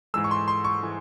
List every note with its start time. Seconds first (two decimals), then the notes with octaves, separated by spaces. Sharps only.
0.14 G#2 E3 G#3 E6
0.24 C#6
0.31 C6
0.48 C6
0.65 C#6
0.83 E3 G#3